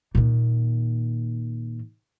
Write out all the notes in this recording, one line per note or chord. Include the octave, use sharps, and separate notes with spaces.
A#2 D#3